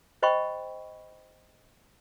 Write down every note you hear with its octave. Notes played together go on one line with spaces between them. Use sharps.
C5 D#5 G5 B5 C#6